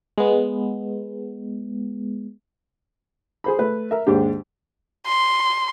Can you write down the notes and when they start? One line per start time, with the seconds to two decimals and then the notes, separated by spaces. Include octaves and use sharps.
0.18 G#3 B3
3.44 G#4 C5 B5
3.59 A3 B4
3.91 A#4 E5
4.07 D#2 G#2 G#3 D4 G4
5.06 C6